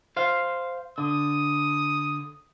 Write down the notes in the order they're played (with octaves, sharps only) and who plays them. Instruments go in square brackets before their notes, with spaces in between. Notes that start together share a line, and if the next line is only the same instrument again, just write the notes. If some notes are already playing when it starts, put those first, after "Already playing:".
[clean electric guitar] C5 F5
[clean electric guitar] D3 [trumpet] D#6